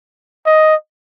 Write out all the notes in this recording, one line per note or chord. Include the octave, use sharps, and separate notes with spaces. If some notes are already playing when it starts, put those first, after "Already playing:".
D#5